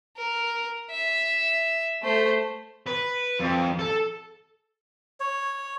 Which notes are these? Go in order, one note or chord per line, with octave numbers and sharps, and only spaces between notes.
A#4
E5
A3 C5
B4
F2
A4
C#5